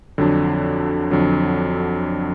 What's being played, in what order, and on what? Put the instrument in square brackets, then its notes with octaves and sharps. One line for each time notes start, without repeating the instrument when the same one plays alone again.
[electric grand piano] F2 D3 F#3 D4
F2 D3 F#3 D4